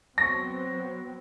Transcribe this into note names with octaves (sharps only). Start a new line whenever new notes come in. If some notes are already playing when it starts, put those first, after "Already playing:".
F#3 B3 C4 C#6 A#6